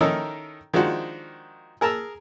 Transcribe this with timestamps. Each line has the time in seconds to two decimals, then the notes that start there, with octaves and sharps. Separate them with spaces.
0.01 D#3 C#4 D#4 E4 A4 A#4
0.73 D#3 F3 G#3 D4 F#4
1.81 G#4 A#4 A5 A#5 E6